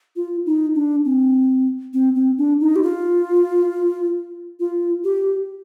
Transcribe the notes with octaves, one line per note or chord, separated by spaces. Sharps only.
F4
D#4
D4
C4
C4
C4
D4
D#4
G4
F4
F4
G4